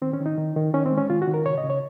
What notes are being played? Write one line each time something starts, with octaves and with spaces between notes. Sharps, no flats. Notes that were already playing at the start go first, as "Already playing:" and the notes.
D#3 C4
C#4
D#3
D#4
D#3
D#3
D#3 C#4
C4
G#3
C#4
D#3 F4
F#4
D#3
A#4
C#3 C#5
D#5
C#3
C#5